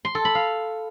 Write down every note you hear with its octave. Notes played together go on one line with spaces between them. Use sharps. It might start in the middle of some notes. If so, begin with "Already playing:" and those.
C6
A4
B5
F5